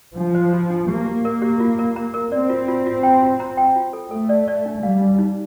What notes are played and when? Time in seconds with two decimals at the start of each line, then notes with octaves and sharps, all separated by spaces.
0.17 F3 D4
0.35 C5
0.53 F4
0.70 D4
0.88 A#3 G4
1.06 G4
1.25 A#4
1.42 G4
1.60 F4
1.79 A#4
1.96 A#5
2.14 A#4
2.32 C4 D5
2.50 F4
2.68 F4
2.86 F4
3.03 G5
3.22 F4
3.40 A#5
3.57 G5
3.76 F4
3.93 A4
4.11 A3 A4
4.29 D5
4.48 D5
4.66 D4
4.83 G3 F5
5.01 D4
5.19 D#4